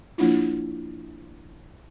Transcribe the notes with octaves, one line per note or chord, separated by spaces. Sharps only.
F3 A#3 D4 E4 F4